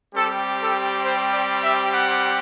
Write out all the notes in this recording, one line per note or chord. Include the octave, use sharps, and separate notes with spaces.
G3 C4 G4 A4
A4
C5
D5
E5
F#5